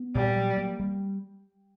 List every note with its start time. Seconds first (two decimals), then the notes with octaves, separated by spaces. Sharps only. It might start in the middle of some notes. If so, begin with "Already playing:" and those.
Already playing: B3
0.15 A#2 G3
0.36 F#3
0.57 A#3
0.80 G3